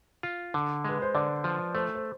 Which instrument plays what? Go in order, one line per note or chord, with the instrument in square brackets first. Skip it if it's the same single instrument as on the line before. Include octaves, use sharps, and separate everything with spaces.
[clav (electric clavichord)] F4
D3
[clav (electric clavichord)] G#3 [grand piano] B4
[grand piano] C5
[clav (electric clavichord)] D3 [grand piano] D5
[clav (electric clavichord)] F3
[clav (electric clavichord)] A3 [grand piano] C5
[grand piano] C5